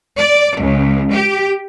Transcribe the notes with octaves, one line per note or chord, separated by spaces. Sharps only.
D5
C#2
G4